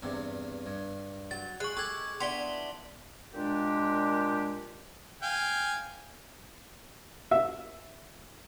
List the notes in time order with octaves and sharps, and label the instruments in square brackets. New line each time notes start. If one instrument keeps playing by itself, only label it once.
[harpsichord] E2 G2 C3
G2
[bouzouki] F#3 [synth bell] A6
[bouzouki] G#3 [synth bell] C#6 F#6
[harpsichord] G4 A4 G5 [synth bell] C#6 G#6
[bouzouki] B3 D4 E4 [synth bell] C6 B6 G7
[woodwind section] A#2 G#3 D4 G4
[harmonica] F5 G5 G#5
[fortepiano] E5